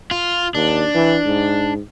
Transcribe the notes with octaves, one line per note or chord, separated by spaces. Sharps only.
F4
D#2 D4
E3
G#2